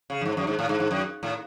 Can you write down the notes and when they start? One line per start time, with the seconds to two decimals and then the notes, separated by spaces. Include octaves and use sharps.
0.10 C#3
0.21 F#2
0.25 G#2
0.37 F#2
0.47 G#2
0.59 A2
0.69 G#2
0.80 G#2
0.91 F#2
1.23 A2